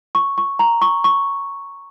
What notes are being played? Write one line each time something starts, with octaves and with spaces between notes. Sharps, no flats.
C#6
C#6
A#5
C#6
C#6